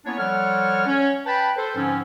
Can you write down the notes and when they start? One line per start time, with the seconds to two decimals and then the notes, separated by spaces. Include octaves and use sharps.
0.05 A#3 B3 C#4 D4 E4 C#5
0.17 F3 G3 A4 C#5 F#5 F6
0.86 C#4 C#5
1.25 B4 G5 A5 B5
1.56 A4 B4 C5
1.75 G#2 D3 F3 C4 C#4